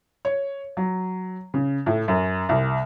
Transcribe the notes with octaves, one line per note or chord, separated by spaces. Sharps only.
C#5
F#3
C#3
A2
F#2
C2